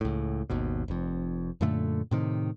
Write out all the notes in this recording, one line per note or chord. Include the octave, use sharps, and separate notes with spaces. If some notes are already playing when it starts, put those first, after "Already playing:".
C#2 A2
G#1 D#2 B2
F1 F2
F#2 A#2 D3 A3
A2 C3 D#3